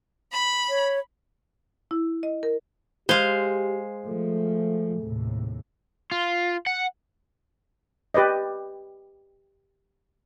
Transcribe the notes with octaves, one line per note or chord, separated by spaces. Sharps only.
B5
C#5
E4
D#5
A#4
G#3 G4 C5 F5
F3 A3
D#2 A2 C3
F4
F#5
G4 B4 D5 D#5